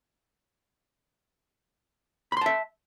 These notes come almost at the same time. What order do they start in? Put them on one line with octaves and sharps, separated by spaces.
B5 C6 A5 E5